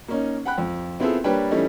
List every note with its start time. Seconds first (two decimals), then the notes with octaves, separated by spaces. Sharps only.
0.08 A#3 C#4 D#4
0.45 F#5 G5 B5 F#6
0.58 F2
1.00 B3 C4 E4 F4 G#4 A4
1.24 G3 A#3 D4 B4 C#5 G5
1.51 E3 G3 A3 C#4 D#4